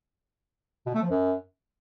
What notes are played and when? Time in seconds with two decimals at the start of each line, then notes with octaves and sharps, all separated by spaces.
0.86 B2
0.94 A3
1.02 F3
1.10 F#2